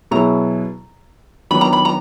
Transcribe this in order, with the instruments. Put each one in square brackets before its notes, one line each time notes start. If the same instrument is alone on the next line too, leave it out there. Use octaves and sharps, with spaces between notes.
[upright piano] B2 F#3 B3 E4 G#4 [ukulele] A#5
[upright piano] D#3 F#3 B3 D4 [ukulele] B5
[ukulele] A#5
B5
A#5